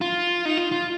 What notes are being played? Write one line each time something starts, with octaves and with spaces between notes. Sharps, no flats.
F4
D#4
F4
F4